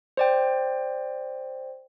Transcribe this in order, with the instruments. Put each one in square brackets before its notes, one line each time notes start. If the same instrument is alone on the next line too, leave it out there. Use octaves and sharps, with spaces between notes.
[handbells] C5 D5 G5